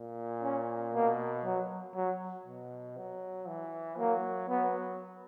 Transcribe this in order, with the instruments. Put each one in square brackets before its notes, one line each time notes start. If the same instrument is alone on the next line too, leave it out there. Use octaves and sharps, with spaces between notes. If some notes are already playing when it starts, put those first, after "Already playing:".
Already playing: [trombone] A#2
[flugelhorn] C#4
[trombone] B2 [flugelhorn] A#3
[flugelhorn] F#3
F#3
[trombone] B2
F#3
E3
[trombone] F#3 [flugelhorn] A#3
[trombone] F#3 [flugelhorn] B3